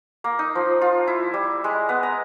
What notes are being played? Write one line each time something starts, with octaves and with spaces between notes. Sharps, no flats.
A#3
D#4
F3
F4
E4
G3
G#3
B3
A#5